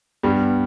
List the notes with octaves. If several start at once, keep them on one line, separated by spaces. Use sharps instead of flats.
G2 G3 B3
B3